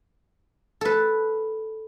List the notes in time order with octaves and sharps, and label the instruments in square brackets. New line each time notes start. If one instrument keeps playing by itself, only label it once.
[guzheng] A4 B4